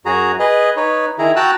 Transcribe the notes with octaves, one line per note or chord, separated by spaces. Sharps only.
F#2 F#4 G#4 A#5
G#4 B4 D#5
D#4 B4 C#5
D#3 E4 G#4 A#5
F#4 G5 A5 A#5 E6 F#6